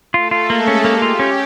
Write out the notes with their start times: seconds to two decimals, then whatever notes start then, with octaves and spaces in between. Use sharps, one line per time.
0.14 A3 F4 A4
0.31 F4
0.49 G#3 A#3 G#4
0.67 C#4
0.84 A#3 G4
1.02 F4
1.19 C#4